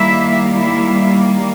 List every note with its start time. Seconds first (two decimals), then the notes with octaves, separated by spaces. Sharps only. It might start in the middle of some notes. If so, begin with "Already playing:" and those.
Already playing: D#3 G3 A#3 E4 E5
0.57 E4 E5